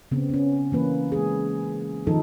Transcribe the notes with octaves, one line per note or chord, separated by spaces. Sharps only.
C#3 B3 C4
B3 C#4
E3 A#3 B4
G#3 G#4
D#3 F3 D#4 A4